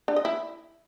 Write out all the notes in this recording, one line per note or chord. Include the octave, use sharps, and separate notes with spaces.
D4
D#5
E4